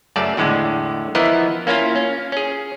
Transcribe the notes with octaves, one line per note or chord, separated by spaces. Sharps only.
F#2 C#3 A3 D5 A5
E2 A2 D3 G#3
E3 F3 B3 E4 A#4 D#5
A#3 C#4 E4 F4 F5
C#4
C#4 G#4